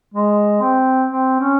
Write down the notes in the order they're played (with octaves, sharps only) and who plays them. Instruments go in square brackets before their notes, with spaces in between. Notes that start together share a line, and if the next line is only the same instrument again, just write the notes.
[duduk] G#3
C4
C4
C#4